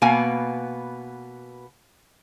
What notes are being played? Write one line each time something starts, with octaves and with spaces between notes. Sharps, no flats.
B2 A#3 B3 G#5